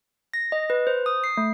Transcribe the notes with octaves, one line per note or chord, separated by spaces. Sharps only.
A#6
D#5
B4
C5
D#6
C7
A3